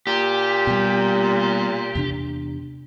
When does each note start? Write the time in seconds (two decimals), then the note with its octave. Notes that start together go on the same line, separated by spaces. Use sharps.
0.07 A#2 G4
0.67 B2 G3
1.95 E2 C3 D4